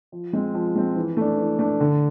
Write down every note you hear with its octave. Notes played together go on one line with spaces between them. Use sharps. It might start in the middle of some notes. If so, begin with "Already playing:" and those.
F3
G#3 C4
F3
G#3 C4
E3
A3 D4
E3
A3 D4
D3